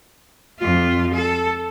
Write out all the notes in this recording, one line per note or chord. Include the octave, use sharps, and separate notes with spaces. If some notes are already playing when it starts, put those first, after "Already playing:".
F2 F4
A4